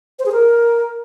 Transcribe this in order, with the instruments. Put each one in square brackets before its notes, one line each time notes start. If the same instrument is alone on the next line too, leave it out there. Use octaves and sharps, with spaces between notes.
[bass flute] C5
G#4
A#4